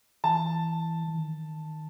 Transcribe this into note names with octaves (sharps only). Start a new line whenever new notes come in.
E3 A5
E3
D#3